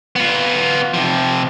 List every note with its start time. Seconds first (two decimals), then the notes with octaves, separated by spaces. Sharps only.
0.16 B3 F4
0.94 C3 F3